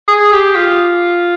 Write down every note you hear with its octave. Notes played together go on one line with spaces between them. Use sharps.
G#4
G4
F4